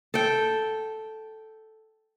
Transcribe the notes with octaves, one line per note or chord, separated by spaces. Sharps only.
A4 G5